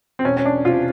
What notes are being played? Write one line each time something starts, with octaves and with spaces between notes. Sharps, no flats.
C4
E1 C#4
C#4
D4
C3 F4